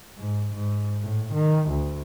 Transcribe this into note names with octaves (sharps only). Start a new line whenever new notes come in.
G#2
G#2
A2
D#3
D2